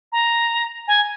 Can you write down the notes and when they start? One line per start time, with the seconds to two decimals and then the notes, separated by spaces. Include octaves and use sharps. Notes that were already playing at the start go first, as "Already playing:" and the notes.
0.12 A#5
0.88 G#5